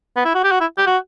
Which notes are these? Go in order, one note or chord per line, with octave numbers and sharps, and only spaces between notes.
B3
E4
F#4
G4
F#4
E4
G4
F#4